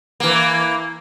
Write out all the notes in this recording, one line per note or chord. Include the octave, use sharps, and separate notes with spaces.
E3 A#3